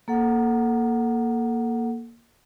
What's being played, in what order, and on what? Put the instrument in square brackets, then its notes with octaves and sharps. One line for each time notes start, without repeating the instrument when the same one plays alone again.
[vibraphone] A#3 A4 F#5